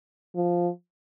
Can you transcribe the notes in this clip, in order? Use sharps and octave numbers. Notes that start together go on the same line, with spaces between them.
F3